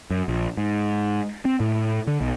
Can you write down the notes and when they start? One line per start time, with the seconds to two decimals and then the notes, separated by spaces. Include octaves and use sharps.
0.10 F#2
0.28 A#1
0.57 G#2
1.45 C4
1.60 A2
2.07 D3
2.21 B1